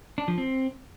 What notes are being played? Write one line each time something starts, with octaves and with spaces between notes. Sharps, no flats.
D4
F3
C4